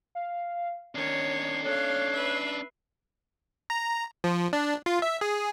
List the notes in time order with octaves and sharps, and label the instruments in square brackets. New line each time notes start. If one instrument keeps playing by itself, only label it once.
[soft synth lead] F5
[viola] D#3 C#5 [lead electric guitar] C#4 D4 [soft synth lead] C7
[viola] A4 F5 [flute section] C#5 F#6
[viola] B4 E5
[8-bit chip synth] A#5
F3
D4
F4
E5
G#4